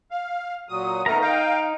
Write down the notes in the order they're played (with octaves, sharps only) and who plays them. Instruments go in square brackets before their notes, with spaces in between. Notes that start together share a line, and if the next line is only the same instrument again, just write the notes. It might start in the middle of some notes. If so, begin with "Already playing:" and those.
[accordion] F5
A#2 F#3 D#6
[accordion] A3 B3 A#4 [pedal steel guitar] D#4 A#5
[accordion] F5 G5